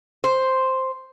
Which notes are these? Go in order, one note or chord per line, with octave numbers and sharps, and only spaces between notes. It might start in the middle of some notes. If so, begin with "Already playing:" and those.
C5